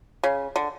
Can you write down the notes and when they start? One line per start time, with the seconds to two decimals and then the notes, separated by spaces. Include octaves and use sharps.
0.23 C#3
0.56 D3